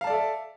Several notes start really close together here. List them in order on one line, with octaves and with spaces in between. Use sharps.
F5 A5 D5 A4 E5